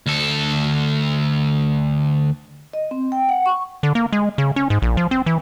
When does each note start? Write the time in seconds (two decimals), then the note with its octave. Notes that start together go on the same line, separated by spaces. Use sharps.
0.06 D2 A4
2.73 D#5
2.91 C4
3.12 G5
3.29 F#5
3.46 C#6
3.83 D3
3.95 A#3
4.13 G#3
4.38 C#3
4.56 C#4
4.70 G#2
4.82 A#1
4.97 F3
5.11 C4
5.26 E3